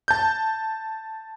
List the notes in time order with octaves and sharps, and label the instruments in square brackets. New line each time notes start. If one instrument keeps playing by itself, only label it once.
[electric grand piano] A5 G6